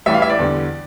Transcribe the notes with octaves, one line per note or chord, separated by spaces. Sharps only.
A1 A2 E3 G3 E5
F5
E5
D5
E2 D3 G3